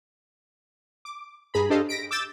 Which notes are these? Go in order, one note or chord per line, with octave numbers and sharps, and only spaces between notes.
D6
G2 G#4 A#5 B5
D4 G4 A4 C5 D#5 F5
A#6 B6 D7
D6 E6 G6 A6 E7